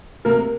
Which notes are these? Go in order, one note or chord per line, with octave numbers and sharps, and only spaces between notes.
C3 A#3 A#4